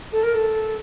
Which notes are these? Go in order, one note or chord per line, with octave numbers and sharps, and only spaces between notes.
A4
A#4
A4